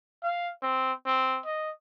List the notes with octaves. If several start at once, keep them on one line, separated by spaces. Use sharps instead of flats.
F5
C4
C4
D#5